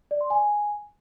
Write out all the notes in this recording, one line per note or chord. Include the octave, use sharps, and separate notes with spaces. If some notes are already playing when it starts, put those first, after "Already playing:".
D5
C6
G#5